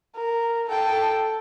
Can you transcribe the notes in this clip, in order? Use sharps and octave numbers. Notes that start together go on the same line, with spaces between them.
A#4
A4 G5